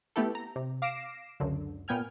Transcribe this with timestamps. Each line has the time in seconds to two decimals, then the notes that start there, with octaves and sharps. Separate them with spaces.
0.16 A3 B3 E4 G4 A4
0.35 A#5
0.56 C3
0.82 F5 D6 A#6 C7 D7 E7
1.40 C#2 F#2 D3
1.88 A#2 B3 G5 G#5 F6